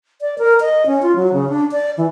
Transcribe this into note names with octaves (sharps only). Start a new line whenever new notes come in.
D5
A#4
D#5
C#4
F4
F#3
C#3
D4
D5
E3